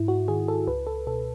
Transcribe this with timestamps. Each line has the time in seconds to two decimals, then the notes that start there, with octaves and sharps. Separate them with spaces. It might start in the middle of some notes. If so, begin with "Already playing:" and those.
Already playing: G#2 E4
0.08 F#4
0.28 D#3 G#4
0.48 A4
0.67 C#2 B4
0.87 A4
1.07 B2 A4